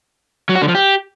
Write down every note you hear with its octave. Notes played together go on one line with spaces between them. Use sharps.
F#3
F#4
D3
F3
G4